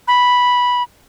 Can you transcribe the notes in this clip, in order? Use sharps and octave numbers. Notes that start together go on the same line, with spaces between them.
B5